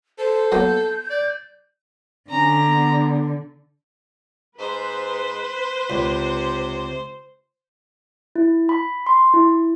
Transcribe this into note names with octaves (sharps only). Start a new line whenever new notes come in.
A4 C5
F#3 A#3 B3 G6
D5
D3 C#4 A#5
B3
G#2 B4 C5
C#2 C3
E4
B5
C6
E4